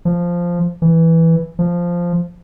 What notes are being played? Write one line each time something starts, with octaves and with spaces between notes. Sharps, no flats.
F3
E3
F3